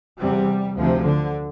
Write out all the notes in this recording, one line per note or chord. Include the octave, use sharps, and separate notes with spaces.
E2 C3 G3
D2 C3 F3
D3